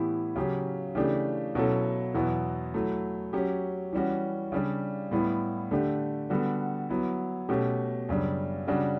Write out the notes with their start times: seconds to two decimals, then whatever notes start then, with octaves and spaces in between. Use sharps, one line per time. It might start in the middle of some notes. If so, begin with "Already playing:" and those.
Already playing: A2 E3 B3 E4 G4
0.36 C#3 F#3 C#4 G4
0.95 C#3 E3 A3 D4 G4
1.55 B2 F#3 C#4 E4 A4
2.14 E2 B2 F#3 B3 E4
2.74 F#3 A3 E4
3.33 F#3 C#4 G4
3.93 E3 G3 C#4 F#4
4.52 C#3 G3 D4
5.11 A2 G3 B3 E4
5.71 D3 A3 D4 G4
6.30 D3 G3 B3 F#4 A4
6.89 F#3 B3 E4
7.49 B2 A3 C#4 G4
8.09 F#2 C#3 G3 D4
8.67 C#3 G3 D4 F#4